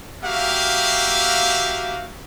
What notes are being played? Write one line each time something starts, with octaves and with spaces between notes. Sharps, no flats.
A#3 F#4 G4 E5 F5